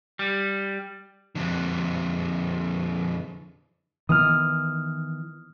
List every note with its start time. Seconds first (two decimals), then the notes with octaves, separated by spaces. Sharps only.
0.19 G3
1.35 F2 D3
4.09 D#3 E3 B3 D#6 F6